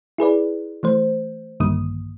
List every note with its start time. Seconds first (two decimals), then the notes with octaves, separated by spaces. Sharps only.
0.18 E4 G#4 B4 D5
0.83 E3 A3 C5
1.60 A#1 G2 D3 D#3 A#3 D#6